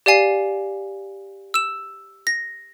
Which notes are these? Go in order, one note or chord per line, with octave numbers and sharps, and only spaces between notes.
G4 D5 F5 G#5 C7
E6 E7
A#6